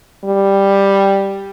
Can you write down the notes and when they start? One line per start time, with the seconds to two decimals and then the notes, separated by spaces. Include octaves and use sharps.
0.24 G3